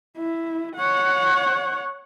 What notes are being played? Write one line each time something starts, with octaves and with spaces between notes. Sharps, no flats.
E4
C#5 F#5